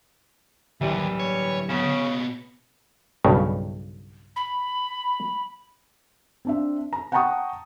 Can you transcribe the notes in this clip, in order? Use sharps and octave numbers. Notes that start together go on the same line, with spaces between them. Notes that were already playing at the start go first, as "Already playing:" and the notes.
D#2 D3 E3 F#3 G3 A#3
C#5
A#2 C#3 B3
B1 G2 C#3
B5
C4 D4 E5
A#5
F#5 G5 A5 A#5 C#6 D#6